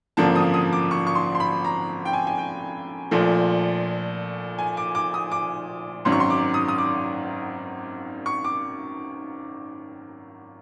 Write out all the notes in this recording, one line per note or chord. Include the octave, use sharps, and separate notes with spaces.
G#1 F#2 D3 F3 A#3 A5
D#6
D#6
D6
C#6
C#6
C6
C6
B5
A#5
G5
G#5
G#5
G5
A#1 A#2 F3 A3
G#5
D6
D6
D#6
D6
G#1 F#2 D#3 F#3 C6
C#6
C6
D6
D#6
D#6
D6
C#6
D6